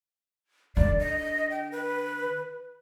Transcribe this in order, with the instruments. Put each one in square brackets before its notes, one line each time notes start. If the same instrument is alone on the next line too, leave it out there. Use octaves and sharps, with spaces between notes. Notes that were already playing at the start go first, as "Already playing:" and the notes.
[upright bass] D3 [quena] D5
[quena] D#5
G5
B4